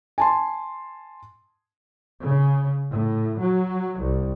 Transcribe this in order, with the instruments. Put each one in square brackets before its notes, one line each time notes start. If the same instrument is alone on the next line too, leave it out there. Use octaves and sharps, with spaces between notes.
[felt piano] G#5 A5 C6
[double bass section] C#3
A2
F#3
C2